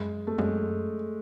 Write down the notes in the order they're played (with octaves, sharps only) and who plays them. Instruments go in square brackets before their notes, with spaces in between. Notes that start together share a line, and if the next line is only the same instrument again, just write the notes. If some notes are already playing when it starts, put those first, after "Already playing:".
Already playing: [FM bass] F#2 [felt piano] G#3
[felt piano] A3
[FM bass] F#2 [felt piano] G#3